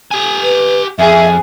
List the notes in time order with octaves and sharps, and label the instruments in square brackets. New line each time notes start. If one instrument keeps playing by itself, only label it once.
[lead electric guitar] G4 G#5
[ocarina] B4
[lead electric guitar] F2 [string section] G#4 [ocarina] E5